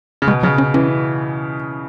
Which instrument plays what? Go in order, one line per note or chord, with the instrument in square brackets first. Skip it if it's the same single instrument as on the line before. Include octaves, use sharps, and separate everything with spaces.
[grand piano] C#3
[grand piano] B2 [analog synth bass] G#3
[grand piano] C#3 [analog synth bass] F#3
[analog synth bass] C#4
[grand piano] E3 [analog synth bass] C#4